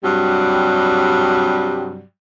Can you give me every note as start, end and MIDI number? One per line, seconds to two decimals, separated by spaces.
0.04 2.02 43
0.04 2.02 48
0.04 2.02 54
0.04 2.02 55